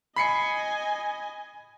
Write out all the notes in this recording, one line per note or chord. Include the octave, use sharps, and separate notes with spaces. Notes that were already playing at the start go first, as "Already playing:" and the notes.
D#5 G#5 B5 C7 C#7